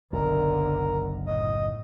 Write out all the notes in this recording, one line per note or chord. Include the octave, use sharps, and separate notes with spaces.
F#1 B1 D3 A#4
A2 D#5